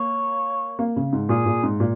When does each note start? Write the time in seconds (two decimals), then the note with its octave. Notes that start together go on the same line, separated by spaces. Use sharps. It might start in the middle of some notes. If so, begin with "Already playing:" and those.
Already playing: A#3 C#5
0.79 A#3
0.96 C#3
1.13 G#2
1.29 A#2 G#4
1.46 A#2
1.63 G#2
1.80 A#2